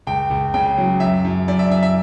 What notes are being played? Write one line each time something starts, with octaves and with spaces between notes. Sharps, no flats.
C#2 G5
C#2
C#3 G5
F#3
F#2 E5
F#2
F#2 D5
E5
F#2 E5
E5